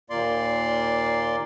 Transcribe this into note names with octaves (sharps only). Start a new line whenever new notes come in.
D#2 A#2 A#3 D5 C6